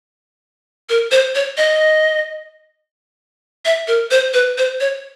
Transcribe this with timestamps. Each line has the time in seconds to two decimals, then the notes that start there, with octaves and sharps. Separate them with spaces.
0.89 A#4
1.11 C5
1.35 C#5
1.57 D#5
3.65 E5
3.88 A#4
4.11 C5
4.34 B4
4.58 C5
4.80 C#5